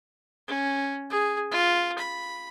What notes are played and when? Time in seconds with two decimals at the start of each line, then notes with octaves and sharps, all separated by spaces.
0.48 C#4
1.10 G#4
1.52 F4
1.98 B5